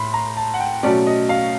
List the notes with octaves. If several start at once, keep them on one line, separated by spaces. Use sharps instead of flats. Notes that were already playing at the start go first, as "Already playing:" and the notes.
Already playing: A2 B5 C6
A#5
A5
F#5
G5
B2 F#3 A3 C#4 D5
D#5
F5